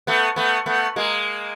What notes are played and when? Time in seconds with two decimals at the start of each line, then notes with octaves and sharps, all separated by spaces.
0.07 A3 B3
0.36 A3 B3
0.66 A3 B3
0.96 G#3 A#3